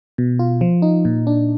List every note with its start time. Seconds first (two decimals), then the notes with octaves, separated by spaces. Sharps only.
0.18 B2
0.39 F4
0.61 F3
0.82 D#4
1.05 A#2
1.27 D4